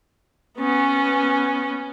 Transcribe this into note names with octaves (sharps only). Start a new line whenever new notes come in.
B3 C#4